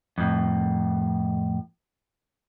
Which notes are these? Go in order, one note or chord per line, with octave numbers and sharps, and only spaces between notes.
F2 A2